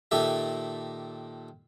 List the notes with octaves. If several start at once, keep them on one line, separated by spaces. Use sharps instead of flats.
A#2 D#3 G4 A4 E5